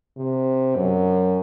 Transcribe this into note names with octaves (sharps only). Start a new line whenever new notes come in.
C3
F#2